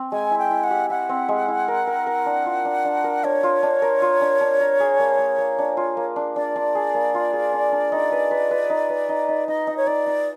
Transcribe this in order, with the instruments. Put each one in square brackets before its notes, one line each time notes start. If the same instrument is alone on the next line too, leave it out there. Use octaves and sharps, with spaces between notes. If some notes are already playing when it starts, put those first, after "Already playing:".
Already playing: [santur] C4
[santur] G#3 [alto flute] G#5
[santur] E4
[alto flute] G5
[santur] E4
[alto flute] F#5
[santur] G4
[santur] E4 [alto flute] F#5
[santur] C4
G#3
E4
A#4
A#4
A#4
D4
F4
D4
D4
A#4
[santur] D4 [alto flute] C#5
[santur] F4
D4
A#4
F4
D4
D4
A#4
G#4
A#3
A#3
A#3
D4
F4
A#3
D4
[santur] D4 [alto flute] D5
[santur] D4
G#4
A#3
F4
G#4
D4
D4
D#4
B4
B4
B4
D#4
B4
D#4
D#4
[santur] D#4 [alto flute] D#5
[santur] D#4
[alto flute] C#5
[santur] D#4 [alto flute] D5
[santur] D#4